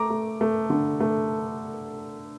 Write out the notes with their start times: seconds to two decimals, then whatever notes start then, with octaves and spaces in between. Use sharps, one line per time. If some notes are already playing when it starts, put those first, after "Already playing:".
Already playing: A3 A#5 D6
0.10 A3
0.41 A3
0.70 D3
1.00 A3